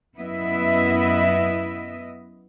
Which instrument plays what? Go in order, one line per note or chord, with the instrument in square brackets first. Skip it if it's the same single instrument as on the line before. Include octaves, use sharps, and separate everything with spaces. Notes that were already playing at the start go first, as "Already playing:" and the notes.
[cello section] F#2 B3 E4 D#5 E5